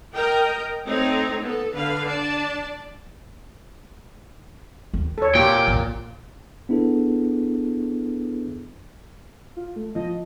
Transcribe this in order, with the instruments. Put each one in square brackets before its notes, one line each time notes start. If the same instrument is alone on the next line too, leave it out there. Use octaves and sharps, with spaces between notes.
[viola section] A#4 D#5 G5
A3 C4 D#4 A4 C#5
B3 A4
D3 B4 F5
D4 D5 A5
[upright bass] D#2
[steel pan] A4 C#5
[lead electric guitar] A#2 [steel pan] F4 G4 [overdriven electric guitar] G5
[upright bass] A#1 F2
[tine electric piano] B3 D4 E4 G#4 A4 B4
[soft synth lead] F4
A3
[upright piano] F3 [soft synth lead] D#5